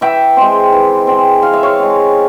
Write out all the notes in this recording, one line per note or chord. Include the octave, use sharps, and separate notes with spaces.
E3 E5 G5
G#3 C4
E3
G#3 C4
E3 F5
E5
C#5 F5
G#3 C4